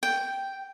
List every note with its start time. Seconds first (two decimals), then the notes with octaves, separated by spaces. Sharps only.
0.03 G5